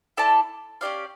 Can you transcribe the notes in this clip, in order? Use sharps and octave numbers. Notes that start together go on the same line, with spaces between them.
E4 A4 D5 A5
C#4 G4 D5 F5